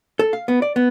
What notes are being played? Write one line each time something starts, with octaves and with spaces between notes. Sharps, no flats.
A4
F5
B3
D5
B3